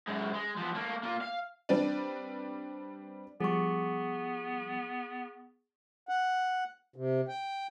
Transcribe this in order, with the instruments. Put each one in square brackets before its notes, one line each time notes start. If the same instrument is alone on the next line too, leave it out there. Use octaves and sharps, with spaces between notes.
[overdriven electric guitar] F#2 G#3
G#3
F3 B3
A3 A#3
A#3 F4
F5
[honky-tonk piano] G3 C4 D4 B4 D5
[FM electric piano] F3 G3 [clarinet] B3 [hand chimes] G#4 C#6
[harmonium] F#5
C3
G5